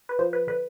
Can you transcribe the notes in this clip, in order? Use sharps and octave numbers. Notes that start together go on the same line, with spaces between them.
B4
F3 C5
B4
D3 B4